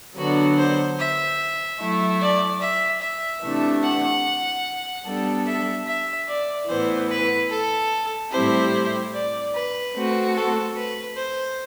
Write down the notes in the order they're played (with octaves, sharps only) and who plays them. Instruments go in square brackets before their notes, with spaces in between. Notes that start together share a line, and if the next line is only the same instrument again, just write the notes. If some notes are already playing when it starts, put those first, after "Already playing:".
[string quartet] D3 F#3 B3 D4 [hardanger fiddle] F#4
[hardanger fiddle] C5
E5
[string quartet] F#3 A3 E4
[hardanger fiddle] D5
E5
E5
[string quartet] C3 E3 A3 D4
[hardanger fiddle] F#5
[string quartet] G3 B3 D4 A4
[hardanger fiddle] E5
E5
D5
[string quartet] A2 E3 B3 [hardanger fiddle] C5
[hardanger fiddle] B4
A4
[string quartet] A2 G3 C4 E4 G4 [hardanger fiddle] C5
[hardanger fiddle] D5
B4
[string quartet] A3 C4 F#4
[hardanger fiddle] A4
B4
C5